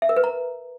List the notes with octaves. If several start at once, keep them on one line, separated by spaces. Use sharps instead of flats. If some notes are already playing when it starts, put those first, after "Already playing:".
E5
A#4
B4
A#5